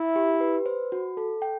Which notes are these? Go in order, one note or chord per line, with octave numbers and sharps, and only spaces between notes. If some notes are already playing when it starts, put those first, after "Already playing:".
Already playing: E4 E5
G4
B4
C5
F#4
A4
G5